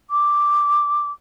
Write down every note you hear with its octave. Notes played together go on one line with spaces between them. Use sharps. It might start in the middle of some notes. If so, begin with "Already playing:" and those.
D6